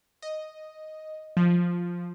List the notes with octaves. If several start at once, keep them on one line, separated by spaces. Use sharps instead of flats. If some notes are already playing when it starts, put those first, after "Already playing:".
D#5
F3